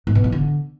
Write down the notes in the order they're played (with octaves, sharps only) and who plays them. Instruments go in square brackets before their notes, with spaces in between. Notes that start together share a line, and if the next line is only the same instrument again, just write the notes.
[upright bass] G#2
B2
F3
D3